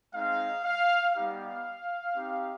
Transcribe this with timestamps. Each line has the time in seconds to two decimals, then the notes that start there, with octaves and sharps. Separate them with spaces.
0.14 G#3 C4 D#4 F5
0.64 F5
1.14 G3 B3 D#4 G4 F5
2.16 C4 D#4 G4